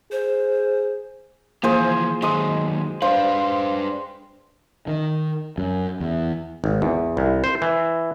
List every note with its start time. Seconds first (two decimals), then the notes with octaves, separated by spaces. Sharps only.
0.12 G#4 C5
1.63 E3 F3 A#3 G#4 C5 G#5
2.22 D#3 F#3 G#3 D#6
3.02 D4 B4 C5 F5
4.88 D#3
5.58 F#2
6.00 E2
6.64 G#1
6.82 E2
7.17 C2
7.44 C5
7.62 E3